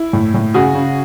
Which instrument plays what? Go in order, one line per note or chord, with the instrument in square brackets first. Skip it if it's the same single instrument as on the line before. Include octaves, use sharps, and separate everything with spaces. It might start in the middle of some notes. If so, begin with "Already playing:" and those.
Already playing: [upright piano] E4
A2
A2
C#3 F#4 G#4
C#3